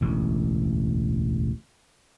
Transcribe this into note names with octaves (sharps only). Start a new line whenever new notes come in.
E1 A1 D2